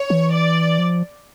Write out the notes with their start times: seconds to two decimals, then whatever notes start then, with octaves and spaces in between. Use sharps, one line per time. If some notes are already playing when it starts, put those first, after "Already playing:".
Already playing: C#5
0.10 E3
0.33 D5
0.79 F3